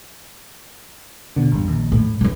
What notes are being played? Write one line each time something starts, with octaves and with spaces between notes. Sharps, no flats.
B2 D3
A1 E2 G2
A#1 D#2
A2
C2 C3 E3